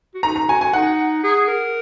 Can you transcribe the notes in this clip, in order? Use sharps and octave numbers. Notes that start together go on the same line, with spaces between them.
F#4
D#4 A#5
A#5
F#4 G#5
G#5
D#4 F#5
G#4
A#4